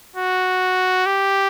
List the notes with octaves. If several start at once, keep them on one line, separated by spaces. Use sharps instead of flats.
F#4
G4